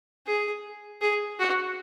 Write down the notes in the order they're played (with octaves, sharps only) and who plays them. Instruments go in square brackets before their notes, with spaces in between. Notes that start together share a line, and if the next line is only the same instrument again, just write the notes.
[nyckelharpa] G#4
G#4
F#4